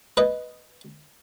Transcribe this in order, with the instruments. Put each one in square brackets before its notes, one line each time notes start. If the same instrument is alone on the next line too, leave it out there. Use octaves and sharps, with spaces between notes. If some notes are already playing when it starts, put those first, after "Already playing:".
[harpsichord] B4 D#5